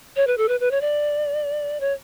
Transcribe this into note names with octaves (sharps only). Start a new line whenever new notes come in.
C#5
B4
A4
B4
B4
C#5
D5
C#5